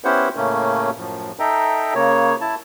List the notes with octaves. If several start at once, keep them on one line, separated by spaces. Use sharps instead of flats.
B3 C#4 E4 G4 C5 F#5
A2 C#3 A3 A#3 C#4
F#2 A2 F3
D#4 A4 E5 G5 A#5
C#3 A#3 C#5
E4 A5